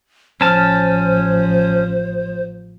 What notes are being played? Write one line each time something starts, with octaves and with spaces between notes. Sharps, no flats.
A1 F3 C#4 C5 A5 F6